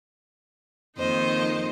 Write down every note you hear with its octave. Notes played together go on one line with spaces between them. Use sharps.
F2 D#3 A#3 D#4 C5 D#5